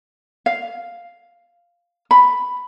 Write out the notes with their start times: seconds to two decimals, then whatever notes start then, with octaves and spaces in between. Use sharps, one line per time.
0.46 F5
2.11 B5